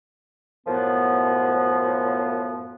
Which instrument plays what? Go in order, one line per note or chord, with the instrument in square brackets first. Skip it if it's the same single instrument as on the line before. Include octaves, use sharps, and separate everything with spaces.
[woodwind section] F#2 A2 F3 B3